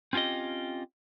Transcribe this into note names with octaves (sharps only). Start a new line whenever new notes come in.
C4 C#4 F4 G4 D#5